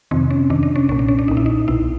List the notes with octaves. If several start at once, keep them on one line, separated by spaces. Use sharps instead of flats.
F2 C3 D#3 C4
C#4
F2 C3 D#3 D4
D4
C#4
B1 A#2 C#4
D4
C#4
D4
B1 A#2 D#4
E4
D#4
B1 B2 E4